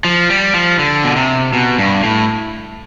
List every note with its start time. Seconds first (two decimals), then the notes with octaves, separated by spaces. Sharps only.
0.05 F3
0.30 G3
0.54 F3
0.79 D3
1.04 B2
1.16 C3
1.53 B2
1.79 G2
2.03 A2